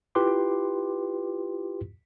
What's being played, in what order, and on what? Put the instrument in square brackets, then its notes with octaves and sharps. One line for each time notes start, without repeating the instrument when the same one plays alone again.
[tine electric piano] E4 F4 G4 B4 C6 D6